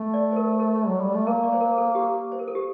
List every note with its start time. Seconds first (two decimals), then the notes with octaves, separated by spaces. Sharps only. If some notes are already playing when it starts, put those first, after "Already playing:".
Already playing: A3
0.14 D5
0.32 C5
0.36 A#4
0.60 A#4
0.87 F#3
1.00 G3
1.14 A3
1.26 A#3 A#4
1.44 D5
1.53 C5
1.61 A#4
1.78 A4
1.95 G4
2.32 C5
2.39 A#4
2.48 A4
2.55 G4